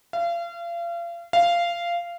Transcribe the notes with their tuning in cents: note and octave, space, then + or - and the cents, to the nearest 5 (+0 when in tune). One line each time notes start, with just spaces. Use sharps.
F5 -35
F5 -15